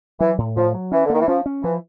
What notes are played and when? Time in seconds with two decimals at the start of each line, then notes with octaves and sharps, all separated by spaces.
0.20 E3 F#3
0.38 A2
0.56 A2 F3
0.74 F#3
0.92 E3 C#4
1.06 D3
1.10 D#3 A#3
1.20 E3
1.27 F3 C#4
1.46 C#4
1.63 E3 F3